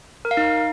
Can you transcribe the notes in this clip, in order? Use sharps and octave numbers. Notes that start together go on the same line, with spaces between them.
A#4
F5
D#4